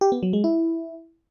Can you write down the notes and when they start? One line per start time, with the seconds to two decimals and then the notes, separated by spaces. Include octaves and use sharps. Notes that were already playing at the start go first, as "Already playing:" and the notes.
0.01 G4
0.12 B3
0.23 F#3
0.33 G#3
0.44 E4